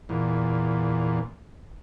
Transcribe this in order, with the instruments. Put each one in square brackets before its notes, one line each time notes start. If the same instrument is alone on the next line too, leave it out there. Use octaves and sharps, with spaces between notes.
[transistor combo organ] E2 A#2